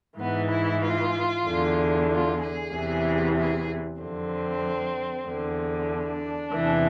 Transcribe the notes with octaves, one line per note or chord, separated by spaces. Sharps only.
G#2 E3 B3
E4
F4
E2 D3
F4
G#4
E2 C3 E3
G#4
F2 D3 C4
E2 D3
D4
E2 C3 E3